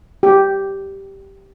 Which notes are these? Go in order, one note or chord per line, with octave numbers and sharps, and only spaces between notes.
G4